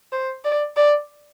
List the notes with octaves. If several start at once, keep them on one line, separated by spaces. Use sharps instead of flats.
C5
D5
D5